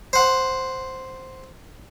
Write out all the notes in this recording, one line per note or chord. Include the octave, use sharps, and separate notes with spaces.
C5 F#5